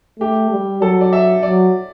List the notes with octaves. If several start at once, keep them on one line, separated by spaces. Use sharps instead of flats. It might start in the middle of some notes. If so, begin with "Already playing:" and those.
A3 G4
G3
F#3 A4
D5
E5
F#3 D5